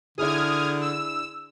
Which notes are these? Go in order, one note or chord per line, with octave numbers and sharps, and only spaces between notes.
D3 D4 E4 G#4 D#6 F6 G#6
E6